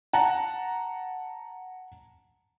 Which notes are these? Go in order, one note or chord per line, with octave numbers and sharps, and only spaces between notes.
F#5 A5 A#5